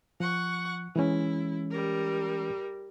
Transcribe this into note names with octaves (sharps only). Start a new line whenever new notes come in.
F3 F#5 C#6
E3 G#3 C#4 E4
G3 A#4